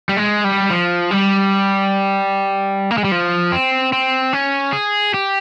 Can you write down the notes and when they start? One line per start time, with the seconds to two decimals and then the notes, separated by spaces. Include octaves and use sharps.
0.09 G3
0.17 G#3
0.44 G3
0.71 F3
1.11 G3
2.91 A#3
2.98 G#3
3.04 G3
3.12 F3
3.52 C4
3.93 C4
4.33 C#4
4.73 G#4
5.14 G4